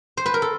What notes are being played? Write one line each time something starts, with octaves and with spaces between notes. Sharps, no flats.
C5
B4
A#4
A4